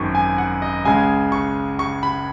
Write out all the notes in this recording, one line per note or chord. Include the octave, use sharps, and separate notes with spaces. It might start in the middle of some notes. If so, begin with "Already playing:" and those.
Already playing: G#1 F#2 D#3 D#4 C#6
G#5
F#5
D#5
C#2 C#3 G#3 G#5
C#6
C#6
B5